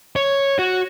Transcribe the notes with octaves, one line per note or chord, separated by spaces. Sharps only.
C#5
F#4